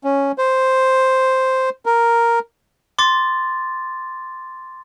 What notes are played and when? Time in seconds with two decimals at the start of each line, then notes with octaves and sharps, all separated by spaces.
0.04 C#4
0.38 C5
1.86 A#4
2.98 C6 D6 A6